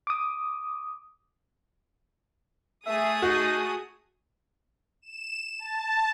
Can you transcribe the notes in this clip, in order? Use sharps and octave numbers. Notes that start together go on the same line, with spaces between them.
D6 D#6
A3 G#4 E5 D#6
D#4 F#4
E7
A5